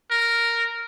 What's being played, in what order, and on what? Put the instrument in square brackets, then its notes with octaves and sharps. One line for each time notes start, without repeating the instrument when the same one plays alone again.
[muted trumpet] A#4